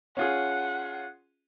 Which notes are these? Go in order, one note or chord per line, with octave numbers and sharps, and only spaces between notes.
C#4 F4 G#4 F#5